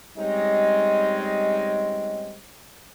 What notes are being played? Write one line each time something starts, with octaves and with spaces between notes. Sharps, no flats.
G3 G#3 C4 C#4 D#4 D#5